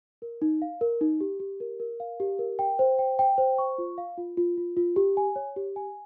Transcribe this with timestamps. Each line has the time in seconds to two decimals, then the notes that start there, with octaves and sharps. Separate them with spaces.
0.22 A#4
0.42 D#4
0.62 F5
0.81 A#4
1.01 D#4
1.21 G4
1.40 G4
1.60 A#4
1.80 A#4
2.00 F5
2.20 G4
2.39 A#4
2.59 G5
2.79 C5
2.99 G5
3.19 G5
3.38 C5
3.58 C#6
3.78 F4
3.98 F5
4.18 F4
4.37 F4
4.58 F4
4.77 F4
4.96 G4
5.17 G#5
5.36 C#5
5.56 G4
5.76 G#5